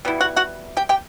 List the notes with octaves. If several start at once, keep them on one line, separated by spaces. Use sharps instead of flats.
B2 G3 E4
F#4 F#5
F#4 F#5
G4 G5
G4 G5